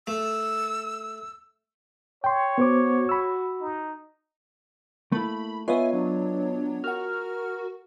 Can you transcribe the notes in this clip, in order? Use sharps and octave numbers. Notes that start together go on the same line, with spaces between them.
A3 E6
C#5 G5 C6
B3 F#4 C5 D6
B5 E6
D#4
A3 A#3 E4 B5
B3 F4 B4 C#5 D#5 E5 G#5
F#3 D4
F#4 A#4 F#5 F6